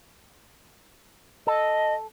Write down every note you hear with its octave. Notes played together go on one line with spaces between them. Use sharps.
A4 D#5